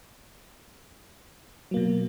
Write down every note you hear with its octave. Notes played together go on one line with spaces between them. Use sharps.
B2 F#3 A#3